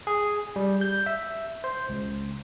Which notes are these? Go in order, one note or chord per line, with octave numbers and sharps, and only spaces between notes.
G#4
G3
G6
E5
C5
C#2